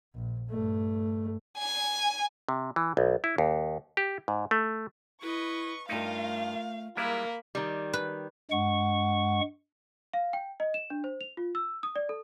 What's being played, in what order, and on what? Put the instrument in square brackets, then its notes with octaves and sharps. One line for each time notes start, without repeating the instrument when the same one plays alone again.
[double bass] A#1
G2 A3
[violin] G#5
[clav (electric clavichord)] C3
E3
B1
E4
D#2
G4
G#2
A3
[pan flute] E4 [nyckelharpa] B4 D#5 [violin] C#6
[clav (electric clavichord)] G2 D#4 [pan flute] A3 [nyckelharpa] F4 A#4 [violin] F5
[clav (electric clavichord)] G3 G#3 E4 [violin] A#3 [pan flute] A#4 [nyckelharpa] B5
[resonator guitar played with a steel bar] D#3 G3
[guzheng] B4
[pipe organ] G2 G#3 F#5 C#6
[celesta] F5
G5
D#5
E7
D4
C5
F7
F4
E6
D#6
D5
A4